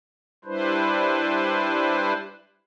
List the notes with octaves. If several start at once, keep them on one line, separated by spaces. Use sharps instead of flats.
G3 D4 E4 B4 C5